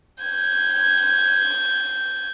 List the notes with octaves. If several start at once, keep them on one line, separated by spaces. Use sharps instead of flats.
G6 G#6